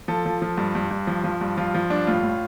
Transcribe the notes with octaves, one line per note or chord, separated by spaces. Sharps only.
F3 A4
F3
F3
G2
G2
G2
F3
F3
G2
F3 F4
F3
G2 D4
A2 F4
A2